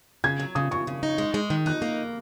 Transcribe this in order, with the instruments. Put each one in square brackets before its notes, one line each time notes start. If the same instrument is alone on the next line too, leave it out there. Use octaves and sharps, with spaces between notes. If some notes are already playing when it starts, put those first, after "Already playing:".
[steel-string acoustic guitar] C#3 [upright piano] G#6
[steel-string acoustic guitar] F#3
[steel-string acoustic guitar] C#3 [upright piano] D#6
[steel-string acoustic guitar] C#3 [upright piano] C#6
[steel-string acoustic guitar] C#3
D#4
G#3
G#3
D#3
[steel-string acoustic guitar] D#4 [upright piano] F#6
[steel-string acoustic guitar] A#3